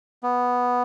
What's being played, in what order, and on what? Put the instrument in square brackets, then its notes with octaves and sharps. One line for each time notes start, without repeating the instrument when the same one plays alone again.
[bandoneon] B3